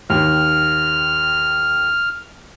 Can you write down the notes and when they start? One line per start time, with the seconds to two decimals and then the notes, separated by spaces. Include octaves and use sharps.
0.10 D#2 D#3 F6